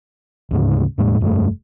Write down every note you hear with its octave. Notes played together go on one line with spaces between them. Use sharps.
D2 G#2 C#3
E2 A2 G#3
F1 G2 C3 A3